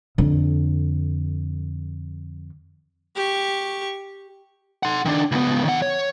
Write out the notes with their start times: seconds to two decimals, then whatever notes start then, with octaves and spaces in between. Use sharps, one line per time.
0.18 F2 D3
3.16 G4 C#6
4.83 F#5 C6
5.05 D#3 D4
5.32 C#2 B3
5.65 D#3 F#5
5.82 C#5